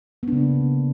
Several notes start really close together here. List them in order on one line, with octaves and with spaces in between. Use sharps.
B3 D4 C#3 A#3